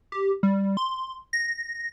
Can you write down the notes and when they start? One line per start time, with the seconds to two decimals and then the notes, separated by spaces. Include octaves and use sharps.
0.12 G4
0.43 G3
0.77 C6
1.33 A#6